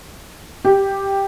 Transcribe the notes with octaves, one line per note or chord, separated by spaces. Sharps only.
G4